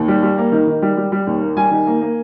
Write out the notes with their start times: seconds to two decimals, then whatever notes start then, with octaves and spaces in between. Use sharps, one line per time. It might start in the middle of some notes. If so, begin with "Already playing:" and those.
Already playing: D#2
0.08 G3
0.23 G3
0.38 A#3
0.52 D#3
0.67 D#3
0.82 G3
0.97 G3
1.12 G3
1.27 D#2
1.42 A#3
1.57 G3 G#5
1.71 D#3
1.87 A#3
2.01 A#3